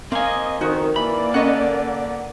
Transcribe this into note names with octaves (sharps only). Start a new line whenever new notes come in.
A#3 C4 D#5 F5 G#5
F2 D#3 D#4 F#4
E3 A#3 D5 B5
D3 C#4 B4 D#5 F#5